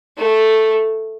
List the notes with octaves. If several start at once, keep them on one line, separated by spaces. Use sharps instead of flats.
A3